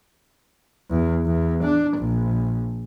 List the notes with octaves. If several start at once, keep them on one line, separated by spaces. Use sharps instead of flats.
E2
E2
D4
A#1